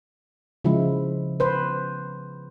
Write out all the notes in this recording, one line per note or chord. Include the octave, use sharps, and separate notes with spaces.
C#3 F3 G#3 E4
B4 C5